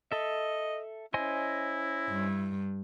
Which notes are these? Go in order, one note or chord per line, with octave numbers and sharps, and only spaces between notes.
A4 D#5 E5
C#4 E4 C5 D#5 G#5
G2